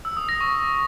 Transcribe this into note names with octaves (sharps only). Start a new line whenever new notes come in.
E6
D#6
A#6
C#6